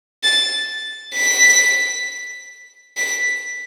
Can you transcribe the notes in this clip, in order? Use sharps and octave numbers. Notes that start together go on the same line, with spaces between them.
A6
B6
B6